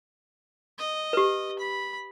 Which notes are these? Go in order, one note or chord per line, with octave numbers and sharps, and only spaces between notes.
D#5
G4 B4
B5